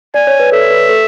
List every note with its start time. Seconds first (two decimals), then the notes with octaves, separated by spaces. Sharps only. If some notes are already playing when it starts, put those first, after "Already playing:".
0.14 D5 G#5
0.27 C#5
0.39 B4
0.52 A4 E5
0.71 B4
0.89 A4